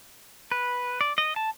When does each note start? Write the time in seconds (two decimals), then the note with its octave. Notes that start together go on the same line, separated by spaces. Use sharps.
0.52 B4
1.01 D5
1.18 D#5
1.36 A5